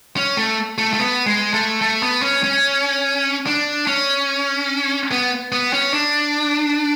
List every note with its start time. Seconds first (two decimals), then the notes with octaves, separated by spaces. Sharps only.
0.17 C#4
0.37 A3
0.78 A3
0.93 A3
0.99 B3
1.26 G#3
1.54 A3
1.82 A3
2.02 B3
2.22 C#4
2.43 C#4
3.46 D4
3.87 C#4
5.11 B3
5.52 B3
5.73 C#4
5.93 D4